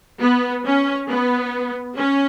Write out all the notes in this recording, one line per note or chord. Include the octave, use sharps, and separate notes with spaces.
B3
C#4
B3
C#4